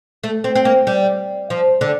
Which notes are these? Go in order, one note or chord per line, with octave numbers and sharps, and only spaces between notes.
A3
C4
C4
A#3
G3
F3
D3